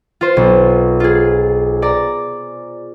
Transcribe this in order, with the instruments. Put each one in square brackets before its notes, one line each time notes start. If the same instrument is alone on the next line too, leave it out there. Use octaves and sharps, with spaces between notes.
[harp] F4 C5
B1
F4 G#4
D5 A#5